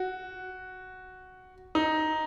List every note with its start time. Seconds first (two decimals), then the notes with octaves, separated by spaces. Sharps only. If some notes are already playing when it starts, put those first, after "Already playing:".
Already playing: F#4
1.75 D#4